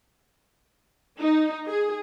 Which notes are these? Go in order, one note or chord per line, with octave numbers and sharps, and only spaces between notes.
D#4
G#4